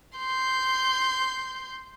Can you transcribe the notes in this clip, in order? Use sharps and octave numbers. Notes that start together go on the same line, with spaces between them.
C6 G6